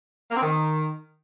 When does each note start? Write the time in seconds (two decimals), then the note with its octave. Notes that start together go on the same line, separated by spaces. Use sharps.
0.30 A#3
0.36 C4
0.42 D#3